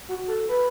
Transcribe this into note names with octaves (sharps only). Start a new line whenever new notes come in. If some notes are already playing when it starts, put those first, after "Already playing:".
F#4
A4
B4